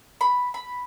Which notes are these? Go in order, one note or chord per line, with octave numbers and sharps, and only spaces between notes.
B5
B5